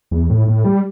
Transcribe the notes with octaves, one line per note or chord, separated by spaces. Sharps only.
E2
A2
A2
G3